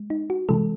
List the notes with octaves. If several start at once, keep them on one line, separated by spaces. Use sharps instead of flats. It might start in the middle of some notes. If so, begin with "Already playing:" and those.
Already playing: G#3
D#4
F#4
C3 E3 G#3 A4